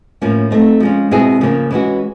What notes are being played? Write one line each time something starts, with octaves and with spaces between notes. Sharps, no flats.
A2 F3 A#3 C#4
A3 C4 D#4
F3 G#3 C#4
B2 G#3 C4 E4 G#4
C#3 F3 A#3 C#4
E3 G#3 C#4 F#4